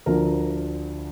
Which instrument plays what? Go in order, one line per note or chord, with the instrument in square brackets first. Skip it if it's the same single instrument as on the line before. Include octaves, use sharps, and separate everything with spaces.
[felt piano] D2 D3 F3 A#4